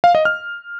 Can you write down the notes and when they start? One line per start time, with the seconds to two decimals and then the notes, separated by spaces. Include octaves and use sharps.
0.04 F5
0.15 D#5
0.25 F6